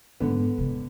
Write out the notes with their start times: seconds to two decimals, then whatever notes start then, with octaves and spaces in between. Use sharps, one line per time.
0.20 G#2 D3 B3
0.58 C3 D#3